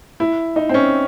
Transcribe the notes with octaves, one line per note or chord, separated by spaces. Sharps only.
E4
D#4
C4
C#4